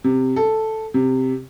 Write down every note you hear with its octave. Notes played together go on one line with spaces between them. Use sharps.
C3
A4
C3